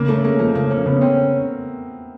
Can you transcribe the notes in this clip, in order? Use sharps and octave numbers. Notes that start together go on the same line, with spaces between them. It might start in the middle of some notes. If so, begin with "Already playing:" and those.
Already playing: C#3 A#3
A3 C#4
G#3 A#3
F3 A#3
C#3 A#3
A#3 C#4
C#3 B3
C4 C#4